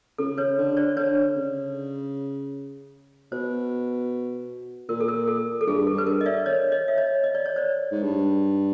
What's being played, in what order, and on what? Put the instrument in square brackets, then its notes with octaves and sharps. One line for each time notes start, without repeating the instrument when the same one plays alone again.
[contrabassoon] C#3 [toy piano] A4
[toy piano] B4 C#5
[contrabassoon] D3
[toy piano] C5 D5
[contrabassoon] D3 [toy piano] B4 C#5
[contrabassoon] C#3
[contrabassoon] B2 [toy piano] C5
[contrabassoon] A#2 [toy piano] A#4
[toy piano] A4
A#4
A4
A4
[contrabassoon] G2 [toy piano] G#4
[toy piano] A4
[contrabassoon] G2
[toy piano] B4
A#4
D#5
D5 E5
C#5 D#5
C#5 D#5
E5
C#5 D#5
D#5
D5
C#5
C5 D5
[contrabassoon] G#2
G2